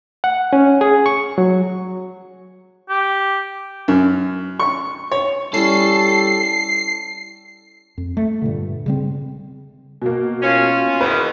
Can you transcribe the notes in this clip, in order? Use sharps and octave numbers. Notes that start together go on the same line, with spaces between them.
F#5
C#4
G#4
C#6
F#3
G4
F#2
C#6
C#5
G3 C#4 E4 A4 C7
F2
A3
G2 A#2 D3
C#3 G3 C4
B2 A#3
C#4 F4
E2 D#3 B4